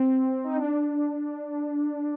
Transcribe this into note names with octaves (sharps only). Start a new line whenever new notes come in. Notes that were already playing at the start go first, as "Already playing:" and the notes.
Already playing: C4
D#4
D4